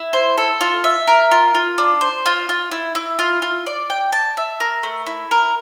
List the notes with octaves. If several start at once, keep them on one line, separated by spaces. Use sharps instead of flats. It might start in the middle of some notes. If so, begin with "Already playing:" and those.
Already playing: E4
C5
A4
F4
E5
A#4
F4
F4
D4
C5
F4
F4
E4
E4
F4
F4
D5
G5
A5
E5
A#4
A3
E4
A#4